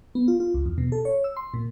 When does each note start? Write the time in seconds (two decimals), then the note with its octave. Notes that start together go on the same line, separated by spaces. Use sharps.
0.15 B3
0.28 F4
0.40 F4
0.54 C#2
0.66 E2
0.78 B2
0.92 A4
1.05 C#5
1.24 E6
1.37 C6
1.54 A#2